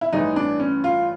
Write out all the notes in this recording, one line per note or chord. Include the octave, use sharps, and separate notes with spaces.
E4
A1 G2 E3 D#4
D4
C#4
F4